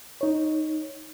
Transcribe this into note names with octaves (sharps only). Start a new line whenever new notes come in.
D#4 C#5